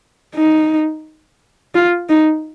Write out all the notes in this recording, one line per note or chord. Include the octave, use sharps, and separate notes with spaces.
D#4
F4
D#4